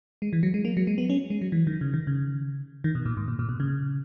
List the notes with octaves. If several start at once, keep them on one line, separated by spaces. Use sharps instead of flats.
G#3
E3
F#3
G#3
A#3
F#3
G#3
B3
C#4
G#3
F#3
E3
D#3
C#3
D#3
C#3
D#3
B2
A#2
G#2
A#2
A#2
B2
C#3